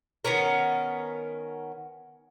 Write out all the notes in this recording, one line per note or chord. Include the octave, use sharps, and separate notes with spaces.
D#3 B3 C#4 A#4